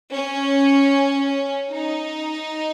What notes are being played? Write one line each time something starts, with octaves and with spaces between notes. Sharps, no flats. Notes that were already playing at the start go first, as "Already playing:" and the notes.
C#4
D#4